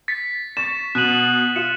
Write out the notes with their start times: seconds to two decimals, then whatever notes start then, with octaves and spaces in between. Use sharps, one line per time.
0.08 A6 B6 C#7
0.57 C#6 A6 E7
0.95 B2 F#6 D#7 F#7
1.56 F4 C#7 E7